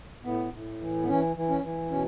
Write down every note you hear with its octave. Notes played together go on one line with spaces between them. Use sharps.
A2 B3
A2
E3
B3
E3 C#4
E3
C#4
E3
B2 C#4